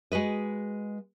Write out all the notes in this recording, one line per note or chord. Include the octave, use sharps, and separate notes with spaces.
G#3 F#4 B4 D#5